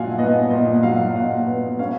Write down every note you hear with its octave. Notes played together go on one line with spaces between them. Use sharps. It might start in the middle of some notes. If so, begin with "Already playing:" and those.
Already playing: A#2 F#3 F5 F#5 G#5
B3 D#5 F#5
A#2 D#5
F#5
F#3 F5
A#2 D#5 F#5
B3
C#4 F5